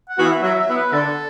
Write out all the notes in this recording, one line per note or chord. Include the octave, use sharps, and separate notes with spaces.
F#5
E3 B3 F#4
E5
F#3 E5
E5
B3 E4
B4
D3 A4